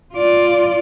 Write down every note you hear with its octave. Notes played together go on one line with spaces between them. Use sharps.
F4 D5